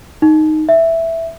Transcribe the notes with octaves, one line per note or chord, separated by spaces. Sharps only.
D#4
E5